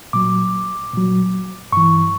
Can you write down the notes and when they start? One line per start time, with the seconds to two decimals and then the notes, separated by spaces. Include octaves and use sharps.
0.13 A#2 F#3 D6
0.93 A#2 F#3
1.72 G2 E3 C#6